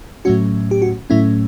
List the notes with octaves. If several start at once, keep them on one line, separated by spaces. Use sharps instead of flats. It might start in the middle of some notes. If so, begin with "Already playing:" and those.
A2 F#3 A3 C#4 F#4
G4
F#4
A2 F#3 A3 C#4 E4